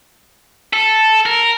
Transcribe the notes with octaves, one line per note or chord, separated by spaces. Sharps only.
A4
A#4